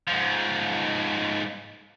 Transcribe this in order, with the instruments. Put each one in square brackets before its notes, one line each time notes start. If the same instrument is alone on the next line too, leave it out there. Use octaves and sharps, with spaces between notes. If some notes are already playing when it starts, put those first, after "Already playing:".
[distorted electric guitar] G#2 F3